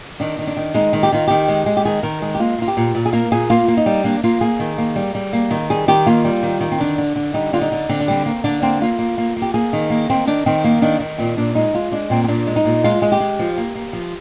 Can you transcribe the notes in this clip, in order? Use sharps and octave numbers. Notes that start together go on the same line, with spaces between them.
D#3 D4
D#3
D4
D#3
G#3 D#4
D#3
G4
D#3 F4
D#3 G4
G#3
G#3
G4
D#3 G#4
D#3 A#4
G#3 G#4
G4
A#3 F4
A#3 F4
G4
A#2
A#2
G#4
A#3 A#4
A#2 G#4
A#3 F4
A#3
D#4
G3
A#3 D4
A#3 F4
A#3 G#4
D#3
A#3
G3
G3
A#3
D#3
G3 G#4
D#3 G4
A#3 F4
G3
D#3
D#3
C4
D3 D4
D3
D3
G3 D#4
D3 F4
D#4
D3
D3 C4
D4
G3 C4
A#3
D3 D4
A#3 C4
A#3 F4
A#3
A#3
A#3
G4
A#3 G#4
D#3
A#3
D#3 C4
D#3 D4
D#3 C4
A#3
D#3 D4
D#3
A#2 C4
A#2 D4
G#3 D#4
G#3 F4
G#3 D4
A#2 C4
C4
A#2 D4
G#3
D#4
A#2
G#3 F4
G#3
G4
G#3
F3
A#3
A#3
F3